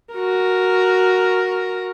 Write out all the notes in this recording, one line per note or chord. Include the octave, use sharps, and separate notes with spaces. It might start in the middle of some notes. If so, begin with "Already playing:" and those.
F#4 A#4